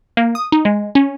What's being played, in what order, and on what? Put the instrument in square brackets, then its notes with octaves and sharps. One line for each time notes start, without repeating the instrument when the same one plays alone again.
[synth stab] A#3
D#6
D#4
G#3
C#4